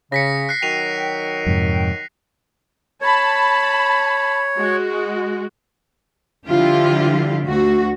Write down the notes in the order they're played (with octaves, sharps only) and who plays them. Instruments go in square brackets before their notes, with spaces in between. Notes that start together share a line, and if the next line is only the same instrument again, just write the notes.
[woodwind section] C#3 [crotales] A#6 B6 C#7
[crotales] F#6 C7
[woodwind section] D#3 F#3 G5 [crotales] D#7 F7
[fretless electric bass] F2 G#2 C3
[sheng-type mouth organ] C#5 [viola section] A5 B5
[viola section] G#3 F#4
[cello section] D3 F3 G3 E4 F4 G4
D2 F#4